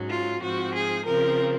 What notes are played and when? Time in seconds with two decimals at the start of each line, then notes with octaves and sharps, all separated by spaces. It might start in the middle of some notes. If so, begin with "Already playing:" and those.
Already playing: G#2 F#3 C#4
0.09 F4
0.41 G#2 F3 C4 F#4
0.73 G#4
1.05 C#3 F3 C4 A#4